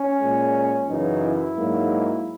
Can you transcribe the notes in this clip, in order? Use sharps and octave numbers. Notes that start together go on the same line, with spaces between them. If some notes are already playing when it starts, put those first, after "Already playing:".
Already playing: C#4
A#2 G#3
F#2 C#3 E3 D#4
E4
G#2 F#3 A#3